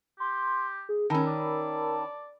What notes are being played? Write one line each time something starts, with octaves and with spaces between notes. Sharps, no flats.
G4 C6
G#4
D#3 C#4 A#4 A5 B5 E6
D5